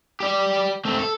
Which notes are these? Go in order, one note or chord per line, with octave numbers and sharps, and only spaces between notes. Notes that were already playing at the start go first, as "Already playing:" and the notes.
G4 D5
A3 C4
A4